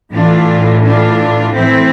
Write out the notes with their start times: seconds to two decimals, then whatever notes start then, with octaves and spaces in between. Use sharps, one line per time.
0.13 A2 E3 D4 F4
0.84 D4 F4
1.54 A2 E3 C4 E4